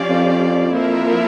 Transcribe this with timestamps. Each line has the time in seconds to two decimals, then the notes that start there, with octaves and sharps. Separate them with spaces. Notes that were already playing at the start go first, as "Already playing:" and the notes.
Already playing: F3 C#4 G4 D5 F5
0.09 F2
0.73 F3 A#3 E4 A#4 E5